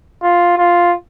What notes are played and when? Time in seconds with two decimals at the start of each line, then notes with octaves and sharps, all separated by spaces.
0.23 F4
0.58 F4